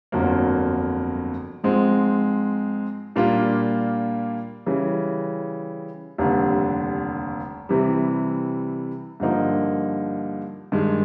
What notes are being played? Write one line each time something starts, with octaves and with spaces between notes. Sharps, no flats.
G1 F2 D3 F#3 A#3
G#2 F3 G#3 C4
A#2 G3 A#3 D4 F4
C#3 E3 G3
F1 D#2 D3 G3
C3 E3 G3
G2 D3 F3 A#3 D#4
G2 D#3 G#3